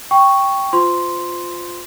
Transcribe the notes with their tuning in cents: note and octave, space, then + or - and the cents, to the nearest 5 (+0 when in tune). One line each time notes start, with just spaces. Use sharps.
G5 +0 C#6 +0
F4 +5 C5 -30 C6 +0